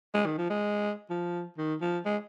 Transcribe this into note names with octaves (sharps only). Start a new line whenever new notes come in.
G#3
D#3
F3
G#3
F3
D#3
F3
G#3